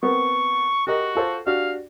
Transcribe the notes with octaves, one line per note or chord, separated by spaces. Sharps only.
B3 C4 A#4 C#6
F#4 G4 A#4 D#5
F4 A4 C5
D4 F#4 G4 F5